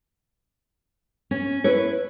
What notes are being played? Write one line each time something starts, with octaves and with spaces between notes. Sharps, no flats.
C#4
E4 B4 C#5